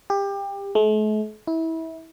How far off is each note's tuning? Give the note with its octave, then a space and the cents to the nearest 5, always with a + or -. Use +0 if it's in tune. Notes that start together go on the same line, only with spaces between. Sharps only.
G4 +25
A3 -45
E4 -25